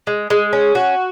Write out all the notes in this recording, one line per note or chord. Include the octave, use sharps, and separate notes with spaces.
G#3
G#3
C#4
F#4